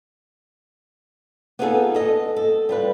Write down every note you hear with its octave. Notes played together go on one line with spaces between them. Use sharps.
B3 D#4 F4 F#4 G#4 A4
A4 D#5
A4
G3 F4 B4